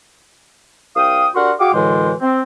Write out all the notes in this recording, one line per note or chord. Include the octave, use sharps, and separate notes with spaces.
C2 F5 G5 D#6
D4 F#4 G4 A#4 F#5 C6
F#4 G#4 F5 G5 D6
F#2 A2 D3 E3 G#3 C5
C4